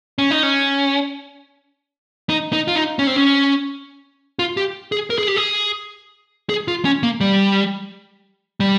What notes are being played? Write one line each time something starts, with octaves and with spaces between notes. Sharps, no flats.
C#4
D#4
C#4
D#4
D#4
F4
D#4
C#4
C4
C#4
F4
G4
G#4
A#4
G#4
G4
G#4
G#4
F4
C#4
A#3
G3
G3